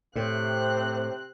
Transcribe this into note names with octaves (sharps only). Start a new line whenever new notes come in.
A2 C3 C4 F#6